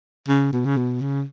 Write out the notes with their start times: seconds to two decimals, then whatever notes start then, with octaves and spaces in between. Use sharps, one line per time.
0.28 C#3
0.53 B2
0.65 C#3
0.77 B2
1.01 C#3